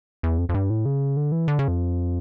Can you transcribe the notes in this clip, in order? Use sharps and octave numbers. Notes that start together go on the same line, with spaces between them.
E2
F2
F2
G2
A2
C#3
D3
E3
D3
C#3
F2